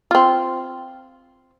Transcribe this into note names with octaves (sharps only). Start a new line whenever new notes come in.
C4 F4